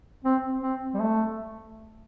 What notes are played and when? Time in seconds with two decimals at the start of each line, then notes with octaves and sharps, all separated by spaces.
0.24 C4
0.63 C4
0.94 G3
1.00 A3